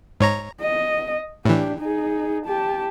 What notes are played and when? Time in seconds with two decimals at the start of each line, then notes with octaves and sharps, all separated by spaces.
0.20 G#2 C#5 A#5
0.61 D#5
1.45 A2 E3 D4 G4
1.79 D#4 G#4
2.46 G4 A5